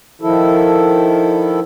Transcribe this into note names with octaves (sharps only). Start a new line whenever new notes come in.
D#3 F3 E4 A4